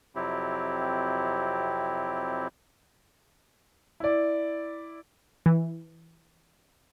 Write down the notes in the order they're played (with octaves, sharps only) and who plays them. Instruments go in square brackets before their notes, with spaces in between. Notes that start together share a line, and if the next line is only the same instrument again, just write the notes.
[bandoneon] F2 C3 F#3 C4 E4 G4
[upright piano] E4 D5
[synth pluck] E3